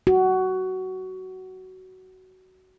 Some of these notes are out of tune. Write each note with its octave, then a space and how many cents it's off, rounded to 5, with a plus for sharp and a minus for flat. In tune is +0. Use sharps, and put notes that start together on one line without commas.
F#4 +15